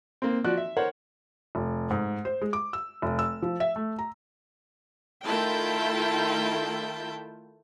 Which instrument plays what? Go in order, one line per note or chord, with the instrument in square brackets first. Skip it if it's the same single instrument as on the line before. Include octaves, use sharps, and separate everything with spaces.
[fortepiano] A#3 C4
F3 F#4 D5 F#6
E5
A#4 C5 C#5 F#5
[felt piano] F1
G#2
C5
G#3
D6
E6
F1
E6
F3
E5
A3
A#5
[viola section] D#3 A3 E4 F4 G5 A5